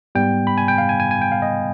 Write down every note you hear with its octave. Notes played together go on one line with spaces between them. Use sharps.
G#2 G3 B3 G5
B5
G#5
G5
F5
G#5
G#5
G#5
G5
F5
D#5